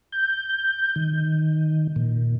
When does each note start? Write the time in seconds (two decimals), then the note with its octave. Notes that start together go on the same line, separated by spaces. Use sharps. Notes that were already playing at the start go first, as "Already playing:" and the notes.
0.12 G6
0.96 D#3
1.96 A#2